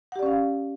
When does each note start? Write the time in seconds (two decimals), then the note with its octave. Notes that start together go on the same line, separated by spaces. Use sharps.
0.12 F#5
0.16 G4
0.19 D5
0.23 C#4
0.26 F5